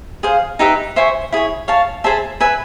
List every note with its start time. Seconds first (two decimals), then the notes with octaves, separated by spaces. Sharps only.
0.23 G#4 C5 F5
0.59 D#4 G4 B4 E5
0.96 C5 E5 G#5 C#6
1.32 E4 G#4 C#5
1.68 C#5 F5 A5
2.04 G#4 C5 E5 A5
2.40 B4 E5 G#5